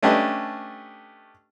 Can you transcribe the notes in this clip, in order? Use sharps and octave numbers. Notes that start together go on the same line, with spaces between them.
A3 C#4 D4 G4 B4 D#5